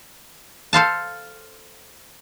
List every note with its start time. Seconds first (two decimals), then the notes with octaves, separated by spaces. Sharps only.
0.73 A4 C5 F5 A5